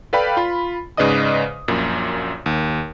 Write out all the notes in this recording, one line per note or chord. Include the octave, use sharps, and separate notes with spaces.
A4 B4 D5 F5 G5 B5
F4 B5
G#2 C#3 B4 D5 D#5 D#6
A#1 F#2 A#2
D#2